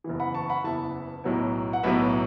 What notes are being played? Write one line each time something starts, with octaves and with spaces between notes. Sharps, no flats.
F#1 E2 E3
F#5 B5
A5 C#6
F#5 B5
F#1 E2 E3 E5 A5
B1 A2 F#3 B3
F#5
B1 A2 F#3 B3 B4 E5